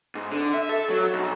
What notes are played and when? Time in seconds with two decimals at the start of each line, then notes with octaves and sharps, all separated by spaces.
0.15 G#2
0.31 D3
0.54 E5
0.69 A4
0.90 F#3
1.13 B1